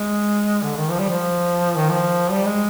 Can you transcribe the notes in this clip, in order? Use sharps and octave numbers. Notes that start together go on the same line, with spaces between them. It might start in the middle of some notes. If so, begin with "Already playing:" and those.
Already playing: G#3
D3
D#3
F3
G3
F3
D#3
F3
G3
G#3